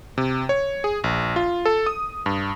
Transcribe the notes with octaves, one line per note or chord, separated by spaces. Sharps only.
C3
C#5
G#4
A#1
F4
A4
D#6
G2